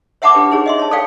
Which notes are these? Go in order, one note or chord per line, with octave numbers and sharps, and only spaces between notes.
C#5 E5 F#5 A5 B5 D6
D4 G4 B4
D#4 G#4 C#5
D#5 E5 C6
C#5 A5
A4 C#5 D5 F5 G5